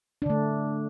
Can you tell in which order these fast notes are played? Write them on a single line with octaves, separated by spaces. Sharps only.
D4 D3 A3